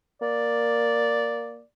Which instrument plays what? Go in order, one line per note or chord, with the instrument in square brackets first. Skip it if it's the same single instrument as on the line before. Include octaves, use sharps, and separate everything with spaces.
[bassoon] A#3 [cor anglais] D5